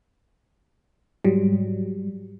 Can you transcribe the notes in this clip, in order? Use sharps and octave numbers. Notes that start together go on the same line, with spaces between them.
G#2 F#3 G3